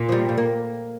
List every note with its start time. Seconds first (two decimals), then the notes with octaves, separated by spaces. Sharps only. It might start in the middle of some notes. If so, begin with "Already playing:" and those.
Already playing: A#2
0.09 F3
0.12 G3
0.29 G3
0.38 A#3